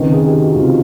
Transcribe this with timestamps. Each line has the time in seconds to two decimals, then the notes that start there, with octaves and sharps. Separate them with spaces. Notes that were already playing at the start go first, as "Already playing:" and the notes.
Already playing: C#2 C3 D#3 B4
0.14 G#4
0.27 G4
0.40 F#4
0.55 C#2 C3 D#3 F4